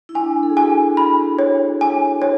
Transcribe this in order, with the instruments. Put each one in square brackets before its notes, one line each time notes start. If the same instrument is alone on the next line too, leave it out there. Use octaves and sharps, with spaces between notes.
[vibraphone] E4
[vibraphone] D4 [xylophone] G#5
[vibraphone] A4
G#4
[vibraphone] F#4 [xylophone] G#5
[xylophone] B5
C#5
G#5
C#5